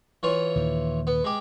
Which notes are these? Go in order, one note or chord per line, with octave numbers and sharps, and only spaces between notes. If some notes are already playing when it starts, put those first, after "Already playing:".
E3 F4 C#5
D#2 A#2 D#3
B3
G#3 G4